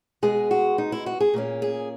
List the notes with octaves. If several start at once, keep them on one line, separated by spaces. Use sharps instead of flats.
B2 G#3 B3 G#4
F#4
D#4
E4
F#4
G#4
A#2 A#3 C#4
G#4